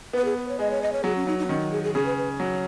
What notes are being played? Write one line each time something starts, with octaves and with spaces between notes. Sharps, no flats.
B3 B4
G#4
B4
C#5
G#3 D#5
C#5
D#5
C#5
F#3 G#4
C#4
F#3 D#4
D#4
B3
D#3 C#4
D#4
G#4
G#4
C#3 G#4
B4
B4
F#3 C#5